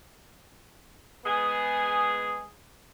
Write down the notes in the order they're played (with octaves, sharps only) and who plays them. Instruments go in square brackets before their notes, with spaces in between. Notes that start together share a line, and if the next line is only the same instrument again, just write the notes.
[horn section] G#3 B3 G#4